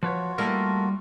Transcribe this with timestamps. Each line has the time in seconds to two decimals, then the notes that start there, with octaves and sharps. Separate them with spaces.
0.03 F3 F4 F#4 B4 C#5
0.38 G3 A3 A#3 E4 A4 A#4